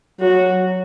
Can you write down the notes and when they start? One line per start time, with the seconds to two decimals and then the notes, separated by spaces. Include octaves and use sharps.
0.20 F#3 F#4